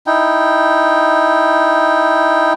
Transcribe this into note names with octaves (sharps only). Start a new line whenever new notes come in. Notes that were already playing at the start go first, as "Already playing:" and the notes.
D#4 E4 G5